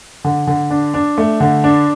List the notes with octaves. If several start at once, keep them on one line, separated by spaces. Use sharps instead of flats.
D3
D3
D4
D4
A3
D3
D4